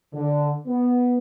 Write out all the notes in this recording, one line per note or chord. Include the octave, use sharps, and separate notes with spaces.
D3
B3